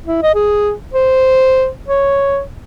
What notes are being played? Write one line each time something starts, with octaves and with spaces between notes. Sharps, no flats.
E4
D#5
G#4
C5
C#5